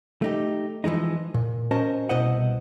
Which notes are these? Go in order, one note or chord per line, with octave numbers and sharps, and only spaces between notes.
A3 D#4 G4
E3 F3 G#3 D#4
A#2
C#4 F#4 A#4 C5 D#5 A5
C2 B2 E4 C5 D#5 F#5